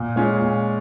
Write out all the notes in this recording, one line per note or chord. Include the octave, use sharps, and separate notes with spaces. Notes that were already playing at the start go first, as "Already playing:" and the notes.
Already playing: A#2
G#3 C#4 F4
A#2